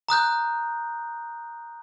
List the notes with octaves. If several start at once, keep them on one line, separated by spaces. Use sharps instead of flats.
A#5 D#6 F#6 G6